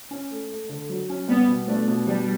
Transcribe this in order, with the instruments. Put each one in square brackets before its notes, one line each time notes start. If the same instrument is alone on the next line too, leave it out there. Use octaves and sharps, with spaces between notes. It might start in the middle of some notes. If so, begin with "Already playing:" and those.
[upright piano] C#4
A3
A3
D3
F#3
C#4
[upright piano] G3 [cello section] B3
[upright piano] B2
[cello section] A3 [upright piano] D4
[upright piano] B2
[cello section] G3 [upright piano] D4